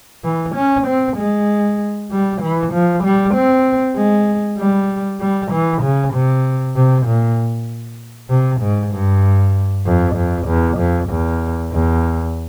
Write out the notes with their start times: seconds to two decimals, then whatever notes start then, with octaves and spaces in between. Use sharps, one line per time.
0.24 E3
0.55 C#4
0.87 C4
1.17 G#3
2.11 G3
2.42 E3
2.73 F3
3.04 G3
3.34 C4
3.97 G#3
4.58 G3
5.20 G3
5.52 E3
5.82 C#3
6.14 C3
6.75 C3
7.06 A#2
8.30 C3
8.61 G#2
8.92 G2
9.86 F2
10.16 F2
10.47 E2
10.78 F2
11.09 E2
11.72 E2